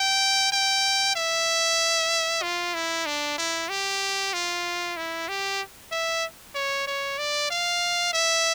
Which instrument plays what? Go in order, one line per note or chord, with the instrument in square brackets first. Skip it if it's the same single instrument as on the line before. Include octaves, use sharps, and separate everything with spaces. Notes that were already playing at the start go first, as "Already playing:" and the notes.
Already playing: [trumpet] G5
G5
E5
F4
E4
D4
E4
G4
F4
E4
G4
E5
C#5
C#5
D5
F5
E5